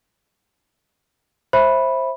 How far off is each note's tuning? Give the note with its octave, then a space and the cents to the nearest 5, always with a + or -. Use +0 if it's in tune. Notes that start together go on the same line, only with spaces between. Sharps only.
C5 +20 E5 +0 B5 -5